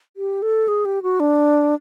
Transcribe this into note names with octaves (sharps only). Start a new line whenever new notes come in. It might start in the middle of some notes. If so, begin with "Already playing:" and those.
G4
A4
G#4
G4
F#4
D4